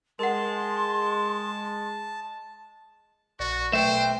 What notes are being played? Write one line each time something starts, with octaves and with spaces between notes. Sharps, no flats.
G#3 A#4 F#5 A5 C6
A#1 F#4 D5 C#6 A6
B1 A3 B4 C5 E5 G5